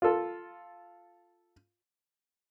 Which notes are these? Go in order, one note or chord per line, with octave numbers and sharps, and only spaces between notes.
F4 A4